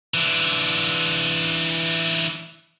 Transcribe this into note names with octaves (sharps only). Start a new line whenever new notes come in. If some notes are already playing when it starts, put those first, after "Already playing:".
E3 D4